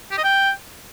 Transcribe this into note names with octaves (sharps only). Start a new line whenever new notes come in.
G4
D#5
G5